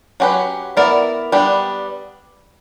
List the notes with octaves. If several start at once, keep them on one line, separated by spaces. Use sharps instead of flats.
F#3 C#4 G4 B4
B3 E4 A#4 D5
G3 B3 D4 G4